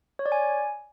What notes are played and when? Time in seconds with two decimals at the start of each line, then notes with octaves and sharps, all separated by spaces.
0.19 C#5
0.26 D5
0.32 G#5